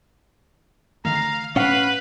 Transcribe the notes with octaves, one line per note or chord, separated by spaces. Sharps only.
D3 D#3 A3 F5 A#5
A2 C#4 B4 F5 F#5